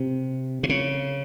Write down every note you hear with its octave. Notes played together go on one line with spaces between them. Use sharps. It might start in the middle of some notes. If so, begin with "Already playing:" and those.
Already playing: C3
C3
C#3